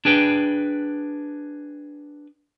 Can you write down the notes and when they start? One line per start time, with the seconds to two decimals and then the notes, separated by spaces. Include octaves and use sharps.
0.05 D4 G#4 B4 G5